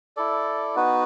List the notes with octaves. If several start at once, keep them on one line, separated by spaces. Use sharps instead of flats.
E4 A4 D5
B3 D#4 F#4 B4